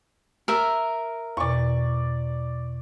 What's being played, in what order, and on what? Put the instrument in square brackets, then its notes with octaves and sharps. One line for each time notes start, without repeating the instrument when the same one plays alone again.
[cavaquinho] A#4 E5
[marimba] E2 B2 [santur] D5 C#6